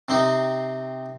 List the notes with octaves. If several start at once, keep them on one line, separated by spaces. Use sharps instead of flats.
C3 C4 D#4